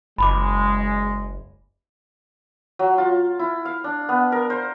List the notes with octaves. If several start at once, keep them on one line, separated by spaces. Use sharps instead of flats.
F#1 G#3 B5 D6
F#3
F4
E4
F5
D4
B3
A#4
C5